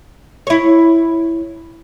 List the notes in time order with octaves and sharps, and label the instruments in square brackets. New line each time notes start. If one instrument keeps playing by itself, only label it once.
[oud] E4 C#5